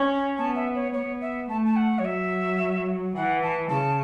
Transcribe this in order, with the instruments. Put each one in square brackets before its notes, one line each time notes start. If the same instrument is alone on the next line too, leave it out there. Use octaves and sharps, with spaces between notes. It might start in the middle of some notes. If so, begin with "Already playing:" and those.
Already playing: [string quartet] C#4
[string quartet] B3 [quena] A5
[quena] E5
C#5
[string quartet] B3 [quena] C#5
[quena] E5
[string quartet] A3 [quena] A5
[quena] A5
F#5
C#5
[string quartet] F#3 [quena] E5
[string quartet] E3 [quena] F#5
[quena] A5
[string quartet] C#3 [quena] A5